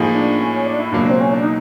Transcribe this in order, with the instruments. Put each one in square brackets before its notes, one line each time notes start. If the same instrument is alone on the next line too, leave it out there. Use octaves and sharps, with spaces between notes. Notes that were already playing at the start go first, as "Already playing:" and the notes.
Already playing: [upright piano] A2 F3 A#3 D#4 G#4
[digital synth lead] D4
C#4
C#4
D4
E4
[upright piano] C#2 B2 F#3 A#3 [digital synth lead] D4
[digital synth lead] C4
C#4
D4
D#4